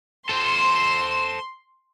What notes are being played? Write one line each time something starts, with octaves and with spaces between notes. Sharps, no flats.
A4 C5 C6